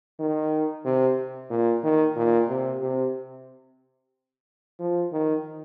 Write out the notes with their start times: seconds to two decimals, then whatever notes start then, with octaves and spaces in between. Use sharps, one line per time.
0.19 D#3
0.84 C3
1.50 A#2
1.83 D#3
2.16 A#2
2.49 C3
2.81 C3
4.79 F3
5.12 D#3